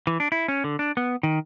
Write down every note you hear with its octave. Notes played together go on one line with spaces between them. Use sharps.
E3
D4
E4
C#4
D3
D4
B3
D#3